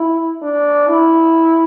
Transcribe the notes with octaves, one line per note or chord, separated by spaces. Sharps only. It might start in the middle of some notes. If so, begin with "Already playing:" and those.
Already playing: E4
D4
E4